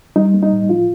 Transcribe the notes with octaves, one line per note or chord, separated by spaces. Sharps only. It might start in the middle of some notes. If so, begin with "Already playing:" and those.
G3 D#4
A#3
D#4
A2
F3 F4